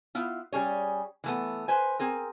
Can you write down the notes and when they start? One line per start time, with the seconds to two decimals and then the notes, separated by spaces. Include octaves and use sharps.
0.15 B3 E4 F4
0.52 G3 C#4 G#4 C#5
1.24 E3 A3 B3
1.68 B4 C5 G#5
1.99 C4 G#4 A#4